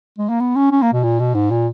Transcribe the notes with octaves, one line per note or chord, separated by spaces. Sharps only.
G#3
A#3
B3
C#4
C#4
A#3
B2
A#2
B2
G#2
A#2